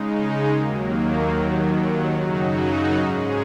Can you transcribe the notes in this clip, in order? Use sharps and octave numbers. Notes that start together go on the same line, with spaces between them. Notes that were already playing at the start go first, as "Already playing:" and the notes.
Already playing: C#3 G#3 D#4
D#2 D#3 F#3 A#3
D#2 D#3 F#3
F#2 C#3 F#3 D#4 F#4
G#2 G#3 C#4 G#4